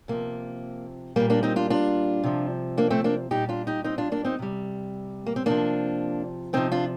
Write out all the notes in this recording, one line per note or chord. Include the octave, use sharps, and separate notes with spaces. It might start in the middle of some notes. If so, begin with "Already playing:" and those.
C3 F3 A#3
A#2 G3 A#3
A#3 D4
C4 D#4
D4 F4
D4 F4
C3 F3
A#3 D4
A3 C4
A#3 D4
A#2 G3 D#4 G4
D4 F4
D#4 G4
C4 D#4
D4 F4
A#3 D4
C4 D#4
C3 G3
A#3
C4
C3 F3 A#3 D4
C3 F3 C4 D#4
D4 F4